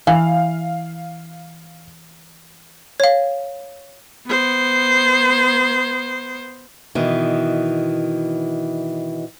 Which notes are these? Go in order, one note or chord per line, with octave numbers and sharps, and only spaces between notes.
E3 F5
C#5 F5
B3 C5
B2 D#3 E3